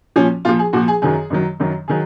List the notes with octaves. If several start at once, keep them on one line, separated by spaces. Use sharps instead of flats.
A#2 F3 C#4
A#2 F3 F4
G#4
A#2 F3 F#4
G#4
F#2 D#3 F#3 G#4
F#2 D#3 F#3
F#2 D#3 F#3
D#3 F#3 G#4